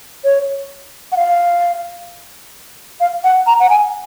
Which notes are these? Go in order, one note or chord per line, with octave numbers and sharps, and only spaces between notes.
C#5
F#5
F5
F5
F#5
A#5
F#5
G#5